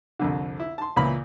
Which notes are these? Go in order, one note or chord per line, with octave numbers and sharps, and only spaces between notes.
C2 F2 D3
E4
A5 C6
C#2 A#2 E3 F5 B5